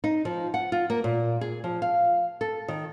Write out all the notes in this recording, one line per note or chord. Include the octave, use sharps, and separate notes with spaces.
D#4
F3
F#5
F4
A#3
A#2
G#4
F3
F5
A4
D#3